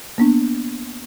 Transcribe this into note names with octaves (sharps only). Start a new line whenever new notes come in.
A#3 B3 D4